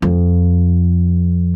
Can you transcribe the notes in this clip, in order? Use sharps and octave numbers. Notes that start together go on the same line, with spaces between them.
F2